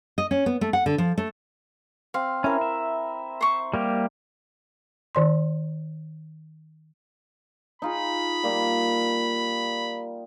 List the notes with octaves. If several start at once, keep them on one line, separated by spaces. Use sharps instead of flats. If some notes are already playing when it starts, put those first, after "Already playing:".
D#5
C#4
B3
A3
F#5
D3
F3
A3
C4 F5
C#4 E4 A#4
E5
C5 C#6
G3 A#3 G4
D#3 D5 C6
D#4 F4 G#4 B5
G3 A#3 F4